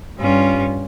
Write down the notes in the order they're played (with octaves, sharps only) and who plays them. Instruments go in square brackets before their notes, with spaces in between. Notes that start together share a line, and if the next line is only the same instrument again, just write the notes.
[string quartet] G2 G3 C#4 F4